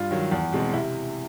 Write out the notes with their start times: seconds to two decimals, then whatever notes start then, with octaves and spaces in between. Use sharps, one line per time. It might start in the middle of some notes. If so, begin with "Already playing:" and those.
Already playing: G2 F4
0.11 D#3 F#3
0.31 E2
0.53 B2 G#3 C4
0.74 C3 E4